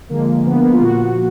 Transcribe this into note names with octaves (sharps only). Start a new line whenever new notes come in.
D3 F3 G#3 A#3
D3 F3 G#3 B3
A#3
B3
F4
A#2 F3 A#3 F#4